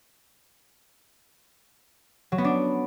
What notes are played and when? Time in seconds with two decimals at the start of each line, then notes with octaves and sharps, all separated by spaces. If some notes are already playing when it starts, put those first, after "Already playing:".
2.32 F#3
2.38 B3
2.45 D4